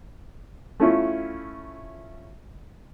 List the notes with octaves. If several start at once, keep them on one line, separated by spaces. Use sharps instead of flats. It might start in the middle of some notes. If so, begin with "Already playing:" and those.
A3 C#4 E4 F4